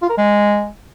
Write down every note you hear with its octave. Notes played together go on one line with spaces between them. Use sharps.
F4
A#4
G#3